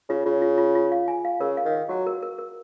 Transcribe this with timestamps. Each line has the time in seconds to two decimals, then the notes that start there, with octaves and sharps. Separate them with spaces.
0.09 C#3 F4
0.25 C#3 F4
0.42 F4
0.58 F4
0.75 F4
0.92 F5
1.08 G#5
1.25 F5
1.40 C#3 A#4
1.57 F5
1.66 D#3
1.72 F5
1.89 F#3 F#4
2.06 A#4
2.23 A#4
2.39 A#4